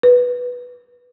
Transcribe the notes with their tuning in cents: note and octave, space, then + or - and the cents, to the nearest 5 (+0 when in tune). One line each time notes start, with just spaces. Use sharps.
B4 -5